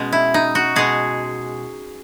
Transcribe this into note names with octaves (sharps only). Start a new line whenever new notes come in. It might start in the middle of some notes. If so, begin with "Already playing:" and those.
Already playing: B2 G#3 C#4
E4
D#4
F#4
B2 G#3 G#4